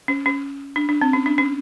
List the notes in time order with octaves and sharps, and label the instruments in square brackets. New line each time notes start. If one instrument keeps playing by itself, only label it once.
[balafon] C#4
C#4
D4
D4
C4
C#4
D4
C#4